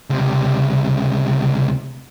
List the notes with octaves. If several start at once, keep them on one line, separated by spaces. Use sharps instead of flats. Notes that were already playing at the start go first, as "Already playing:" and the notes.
C#2 C3